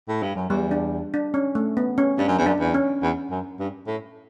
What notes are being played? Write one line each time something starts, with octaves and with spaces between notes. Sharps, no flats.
A2
G2
F#2
E2 G3
D4
D4
C#4
A3
B3
C#4
G2 D4
F#2
E2
F#2 D4
E2
C#4
E2
F#2
G2
A2